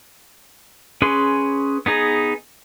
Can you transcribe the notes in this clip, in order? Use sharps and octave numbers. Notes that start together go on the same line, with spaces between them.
C#4 G#4 B4 G#5 C6
B3 D#4 G#4 A#5